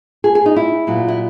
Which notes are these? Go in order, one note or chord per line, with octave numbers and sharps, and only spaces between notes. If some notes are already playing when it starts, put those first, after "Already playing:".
G#4
G#4
D#4
E4
A#2 F#3 B3
E4